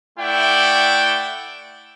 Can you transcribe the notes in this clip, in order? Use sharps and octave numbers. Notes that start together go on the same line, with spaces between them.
A3 E4 D5 F#5 G5